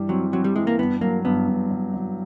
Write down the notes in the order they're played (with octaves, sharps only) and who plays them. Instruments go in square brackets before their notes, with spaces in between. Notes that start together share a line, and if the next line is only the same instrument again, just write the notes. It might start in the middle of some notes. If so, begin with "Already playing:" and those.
Already playing: [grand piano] G2 E3 G3
[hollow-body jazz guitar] F#3 [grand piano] C4
[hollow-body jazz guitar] F#3 [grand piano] C4
[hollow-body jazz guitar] G3
[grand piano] E3 [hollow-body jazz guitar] G#3
[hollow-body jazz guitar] A#3
[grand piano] G2 [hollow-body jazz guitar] B3
[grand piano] F#3 [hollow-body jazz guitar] A#3
[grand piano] G2 [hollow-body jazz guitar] B3
[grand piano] G2
F#3
F#3